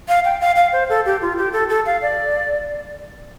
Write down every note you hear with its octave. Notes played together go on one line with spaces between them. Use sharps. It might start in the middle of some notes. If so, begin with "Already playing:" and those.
F5
G5
F5
F5
C5
A4
G4
F4
G4
A4
A4
F5
D5